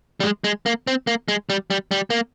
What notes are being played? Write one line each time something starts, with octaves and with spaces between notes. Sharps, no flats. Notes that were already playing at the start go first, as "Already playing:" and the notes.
G3
G#3
G#3
A#3
C4
A#3
G#3
G3
G3
G3
A#3